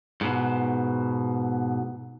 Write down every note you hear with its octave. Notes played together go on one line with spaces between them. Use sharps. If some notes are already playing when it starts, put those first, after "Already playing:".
G#2 B2